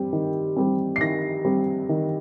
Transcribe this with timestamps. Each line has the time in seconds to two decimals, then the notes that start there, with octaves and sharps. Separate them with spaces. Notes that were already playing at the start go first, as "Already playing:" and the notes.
Already playing: G3 C4
0.13 D#3
0.57 G3 C4
0.96 C7
1.01 D#3 A#6
1.45 G3 C4
1.89 D#3